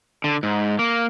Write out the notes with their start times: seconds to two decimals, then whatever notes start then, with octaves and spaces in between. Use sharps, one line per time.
0.24 D3
0.43 G#2
0.79 A#3